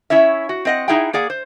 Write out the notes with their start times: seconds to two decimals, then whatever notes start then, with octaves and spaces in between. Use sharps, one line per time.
0.10 C#4 E4 C#5 E5
0.49 F#4
0.65 C4 D#5 F#5
0.88 D#4 E4 G#4 E5 F#5 G5
1.13 A#3 G#4 D5 F#5
1.30 C5